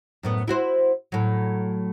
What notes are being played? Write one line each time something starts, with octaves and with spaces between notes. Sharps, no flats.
F#2 A2 B3
E4 F#4 C5
A2 F#3